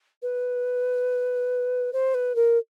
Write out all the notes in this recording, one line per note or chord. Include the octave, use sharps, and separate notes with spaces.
B4
C5
B4
A#4